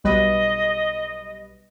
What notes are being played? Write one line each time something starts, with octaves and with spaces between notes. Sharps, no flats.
B1 G3 B4 D#5